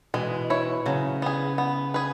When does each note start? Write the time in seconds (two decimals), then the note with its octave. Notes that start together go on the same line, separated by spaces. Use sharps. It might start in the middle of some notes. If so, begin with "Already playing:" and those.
0.14 B2 E3 G#3
0.50 E4 C#5
0.86 C#3 F#3
1.22 B3 G#4
1.58 B3
1.94 G#4 B4